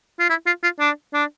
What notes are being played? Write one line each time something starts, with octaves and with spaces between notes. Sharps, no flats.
F4
E4
F4
F4
D4
D4